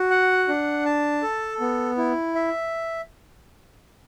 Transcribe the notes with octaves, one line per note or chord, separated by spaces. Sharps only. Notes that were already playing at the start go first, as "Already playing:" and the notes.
Already playing: F#4
F#5
D4
A5
A4
B3
E4
E5